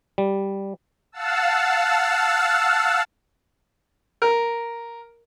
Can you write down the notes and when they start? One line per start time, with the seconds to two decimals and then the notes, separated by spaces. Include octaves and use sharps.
0.18 G3
1.12 F5 F#5 A5 E6
4.22 A#4